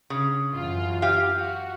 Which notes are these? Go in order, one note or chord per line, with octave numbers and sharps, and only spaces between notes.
C#3
F#2 E3 F4
G4 F5
F#4